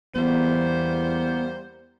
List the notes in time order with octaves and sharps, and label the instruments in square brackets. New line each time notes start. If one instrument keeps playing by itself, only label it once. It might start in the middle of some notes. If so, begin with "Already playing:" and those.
[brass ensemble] E2 [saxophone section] G3 A#3 C5 [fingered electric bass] B3